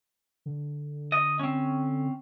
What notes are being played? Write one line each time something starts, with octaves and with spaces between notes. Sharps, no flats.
D3
D#5
C4 C#4